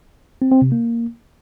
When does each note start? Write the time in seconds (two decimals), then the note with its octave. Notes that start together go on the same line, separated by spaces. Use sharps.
0.42 C4
0.52 C4
0.62 C3
0.72 A#3